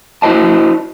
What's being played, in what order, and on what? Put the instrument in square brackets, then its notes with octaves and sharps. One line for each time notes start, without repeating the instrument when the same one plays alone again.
[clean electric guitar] E4 F#4 A#4 C5 D#5 A5